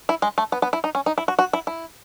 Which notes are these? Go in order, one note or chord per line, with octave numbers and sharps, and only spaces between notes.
E4
G#3
A3
B3
B3
E4
D#4
C#4
D#4
E4
F#4
F#4
E4
E4